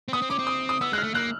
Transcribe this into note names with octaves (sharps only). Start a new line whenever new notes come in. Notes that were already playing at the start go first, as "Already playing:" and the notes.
C4
B3 D#6
C4
C#4 D6
C4
D#6
D#6
B3 E6
G#3 F#6
F6
A3
A#3 F#6